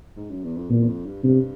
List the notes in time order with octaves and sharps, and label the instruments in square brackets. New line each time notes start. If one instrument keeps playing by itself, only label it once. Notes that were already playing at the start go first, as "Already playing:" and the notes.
[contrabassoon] G#2
F#2
E2
F2
[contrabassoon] E2 [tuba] A#2
[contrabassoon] E2
F2
G2
[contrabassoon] G2 [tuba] C3